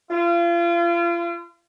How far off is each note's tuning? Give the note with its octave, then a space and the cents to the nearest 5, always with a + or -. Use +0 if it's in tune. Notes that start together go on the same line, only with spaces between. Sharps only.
F4 -35